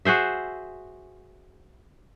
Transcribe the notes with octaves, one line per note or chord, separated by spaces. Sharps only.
F#4 G#4 C5 E5